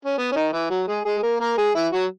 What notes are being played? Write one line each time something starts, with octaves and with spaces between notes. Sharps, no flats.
C#4
B3
C#4
D#3 D#4
E3 E4
F#3 F#4
G#3 G#4
G#3 G#4
G#4
A#3 A#4
A#3 A#4
G#3 G#4
E3 E4
F#3 F#4